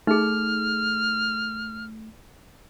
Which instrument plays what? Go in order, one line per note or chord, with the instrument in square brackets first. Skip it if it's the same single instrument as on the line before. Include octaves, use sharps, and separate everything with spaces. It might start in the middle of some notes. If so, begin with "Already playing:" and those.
[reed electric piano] A3 [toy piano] D#4 G#4 [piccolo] F6